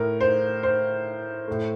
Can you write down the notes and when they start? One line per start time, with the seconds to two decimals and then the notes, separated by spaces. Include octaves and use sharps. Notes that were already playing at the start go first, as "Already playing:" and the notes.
Already playing: A2 A3 A#4
0.21 C5
0.63 C5
1.48 A2 A3